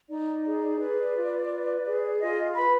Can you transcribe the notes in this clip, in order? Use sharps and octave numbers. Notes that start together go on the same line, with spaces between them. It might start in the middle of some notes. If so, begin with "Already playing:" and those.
D#4 D5
G#4
B4 D5
F4
B4
G#4
F4 D#5
B4 B5